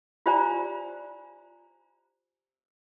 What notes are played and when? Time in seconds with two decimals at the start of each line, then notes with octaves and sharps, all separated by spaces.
0.26 F4 G4 C5 D5 G#5 A#5